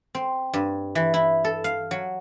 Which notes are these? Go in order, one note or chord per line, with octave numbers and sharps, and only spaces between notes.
C4
G2
E3
E4
A4
F5
F#3